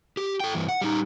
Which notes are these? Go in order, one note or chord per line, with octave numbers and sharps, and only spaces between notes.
G4
A4 G5
G2 E3
F#5
G3 D#4